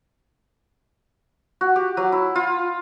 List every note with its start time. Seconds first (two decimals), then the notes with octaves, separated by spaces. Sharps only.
1.61 F#4
1.76 G4
1.97 F#3
2.12 E4
2.35 F4